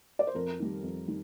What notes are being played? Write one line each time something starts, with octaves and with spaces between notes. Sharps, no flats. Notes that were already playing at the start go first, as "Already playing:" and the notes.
D5
C5
F2 A#4
D#3 G3
F2
D#3 G3